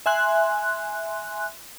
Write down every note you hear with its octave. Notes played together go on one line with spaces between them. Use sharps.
E5 G#5 C6 F#6